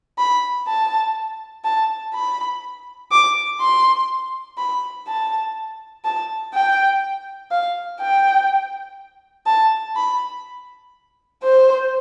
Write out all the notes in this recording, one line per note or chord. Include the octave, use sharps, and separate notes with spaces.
B5
A5
A5
B5
D6
C6
B5
A5
A5
G5
F5
G5
A5
B5
C5